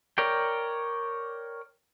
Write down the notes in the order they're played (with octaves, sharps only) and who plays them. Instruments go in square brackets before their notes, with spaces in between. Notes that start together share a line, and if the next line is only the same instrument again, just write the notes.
[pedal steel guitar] A#4 C#5 D5 G5